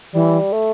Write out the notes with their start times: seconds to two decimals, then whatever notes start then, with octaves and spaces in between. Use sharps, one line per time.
0.14 E3 G3
0.53 A3